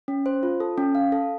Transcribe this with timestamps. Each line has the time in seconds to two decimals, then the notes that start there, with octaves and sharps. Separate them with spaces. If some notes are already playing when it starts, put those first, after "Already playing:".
0.08 C#4
0.26 C5
0.43 F4
0.60 A4
0.78 C#4
0.95 F5
1.12 A4